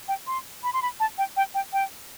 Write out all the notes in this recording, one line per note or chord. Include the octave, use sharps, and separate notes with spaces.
G5
C6
B5
C6
B5
A5
G5
G5
G5
G5